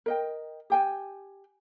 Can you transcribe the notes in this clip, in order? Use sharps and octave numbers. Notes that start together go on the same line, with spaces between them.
A#4 D#5 G5
G4 G5 G#5